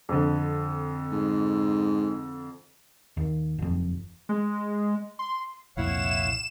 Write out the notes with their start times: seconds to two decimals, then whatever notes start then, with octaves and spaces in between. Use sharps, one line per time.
0.09 F2 D3
1.12 G#2
3.17 D#2
3.59 F#1 F2
4.29 G#3
5.19 C6
5.77 C2 F2 A#2 E4 C#5 F5 F#5 E7